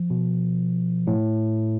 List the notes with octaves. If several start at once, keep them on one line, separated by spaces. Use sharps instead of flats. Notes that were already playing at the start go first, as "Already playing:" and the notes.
Already playing: F3
B2
A2